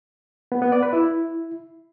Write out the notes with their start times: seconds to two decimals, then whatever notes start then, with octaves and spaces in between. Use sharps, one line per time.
0.52 B3
0.62 B3
0.72 D5
0.83 B4
0.93 E4